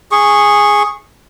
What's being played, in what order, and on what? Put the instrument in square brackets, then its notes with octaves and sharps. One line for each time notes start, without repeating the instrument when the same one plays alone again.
[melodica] G#4 C#6